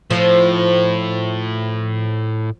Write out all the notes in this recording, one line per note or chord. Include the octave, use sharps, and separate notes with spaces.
A2 F3